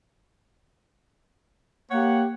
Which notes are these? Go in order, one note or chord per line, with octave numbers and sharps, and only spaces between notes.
A#3 G4 C#5 F#5